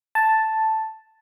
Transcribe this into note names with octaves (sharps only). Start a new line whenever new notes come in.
A5